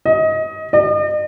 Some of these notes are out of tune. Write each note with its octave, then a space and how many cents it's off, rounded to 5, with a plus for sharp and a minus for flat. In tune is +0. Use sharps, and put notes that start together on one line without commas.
D#5 +25
D#5 -45